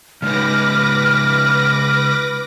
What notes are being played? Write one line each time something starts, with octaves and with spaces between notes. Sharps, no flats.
C#3 G#3 D#4 B4 D6 F6 A#6